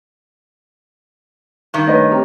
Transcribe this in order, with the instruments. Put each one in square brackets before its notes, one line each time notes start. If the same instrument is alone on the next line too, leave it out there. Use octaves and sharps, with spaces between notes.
[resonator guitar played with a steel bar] G2 D#3
[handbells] A3 C#5 [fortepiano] B4 D#5
[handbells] C4 G4 A#5